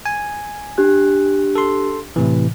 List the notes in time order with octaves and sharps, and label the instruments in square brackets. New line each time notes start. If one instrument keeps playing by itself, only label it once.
[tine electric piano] G#5
[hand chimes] D4 G4 F#6
[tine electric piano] A4 C6
A2 C3 E3